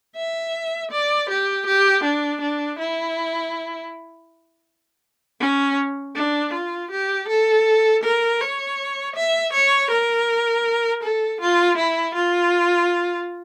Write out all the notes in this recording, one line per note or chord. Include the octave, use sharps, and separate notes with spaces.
E5
D5
G4
G4
D4
D4
E4
C#4
D4
F4
G4
A4
A#4
C#5
E5
C#5
A#4
A4
F4
E4
F4